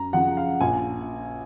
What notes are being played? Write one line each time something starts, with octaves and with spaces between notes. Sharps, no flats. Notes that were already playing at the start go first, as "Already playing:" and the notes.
Already playing: F#2 A#5
C#3 F3 F#5
F5
A#1 G#5